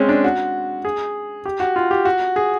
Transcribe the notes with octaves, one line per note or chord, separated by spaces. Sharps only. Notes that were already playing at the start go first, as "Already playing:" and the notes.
Already playing: G#3 C4 C#4
D4
F#4
G#4
G4
F#4
F4
G4
F#4
G#4